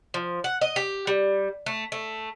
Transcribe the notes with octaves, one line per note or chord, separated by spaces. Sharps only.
F3
F#5
D#5
G4
G3
A3
A3